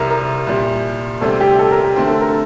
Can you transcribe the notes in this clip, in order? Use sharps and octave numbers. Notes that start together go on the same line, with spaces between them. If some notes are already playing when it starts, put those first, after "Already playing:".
Already playing: C2 C3 G3 A#4
A#4
C2 A#2 G3
D2 C3 G3 C4 A4
G4
A4
A#4
G4
D3 A3 C4 G4
A4
A#4
A4